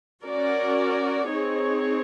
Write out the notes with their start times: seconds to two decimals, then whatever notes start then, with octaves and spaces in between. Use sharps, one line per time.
0.25 C#4 F#4 A#4 D5
1.29 C4 D#4 G#4 C#5